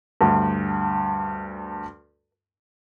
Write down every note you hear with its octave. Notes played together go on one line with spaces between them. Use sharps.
D2 G2